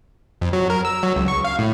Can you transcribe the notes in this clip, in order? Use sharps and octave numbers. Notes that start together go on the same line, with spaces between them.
F2
F#3
A#4
E6
F#3
C#2
C#6
F5
A2